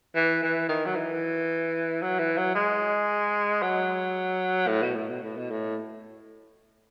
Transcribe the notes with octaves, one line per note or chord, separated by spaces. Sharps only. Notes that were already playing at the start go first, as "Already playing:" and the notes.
E3
E3
D#3
F#3
E3
F#3
E3
F#3
G#3
F#3
A2
B2
A2
B2
A2
B2
A2